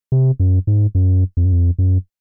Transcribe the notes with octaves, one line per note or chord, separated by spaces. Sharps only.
C3
F#2
G#2
F#2
F2
F#2
F2
F#2